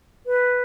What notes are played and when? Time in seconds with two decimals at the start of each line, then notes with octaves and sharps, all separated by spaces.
0.26 B4